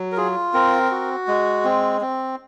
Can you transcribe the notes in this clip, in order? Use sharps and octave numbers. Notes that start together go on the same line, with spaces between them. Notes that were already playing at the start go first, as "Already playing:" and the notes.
Already playing: F#3
A#4
F4 G#4
C4 A#4
F#4
G#3
C4
C4